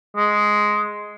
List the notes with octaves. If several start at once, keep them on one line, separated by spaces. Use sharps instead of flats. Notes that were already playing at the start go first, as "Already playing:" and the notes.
G#3